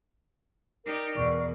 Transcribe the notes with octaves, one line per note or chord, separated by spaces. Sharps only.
D#4 G4 A#4 D5
E2 B2 D5 C#6